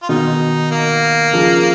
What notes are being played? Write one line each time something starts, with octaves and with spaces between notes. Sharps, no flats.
F4
B2 D#3 D#4
A#3
C#3 F3